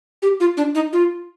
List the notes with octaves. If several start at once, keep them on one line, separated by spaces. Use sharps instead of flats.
G4
F4
D4
D#4
F4